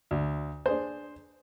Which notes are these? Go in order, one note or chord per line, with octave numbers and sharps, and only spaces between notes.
D2
D4 G#4 C5